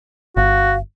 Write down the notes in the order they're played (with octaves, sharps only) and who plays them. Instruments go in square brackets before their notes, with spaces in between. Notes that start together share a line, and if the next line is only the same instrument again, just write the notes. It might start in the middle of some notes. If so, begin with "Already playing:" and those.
[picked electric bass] G1 [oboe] F#4 [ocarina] F5